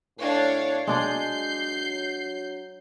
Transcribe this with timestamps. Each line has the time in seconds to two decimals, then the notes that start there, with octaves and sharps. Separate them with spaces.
0.19 A2 D4 C#5 F5
0.87 F#3 G#3 D4 G#4 G6 C7